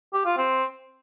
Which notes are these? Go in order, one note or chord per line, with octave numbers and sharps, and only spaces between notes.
G4
F4
C4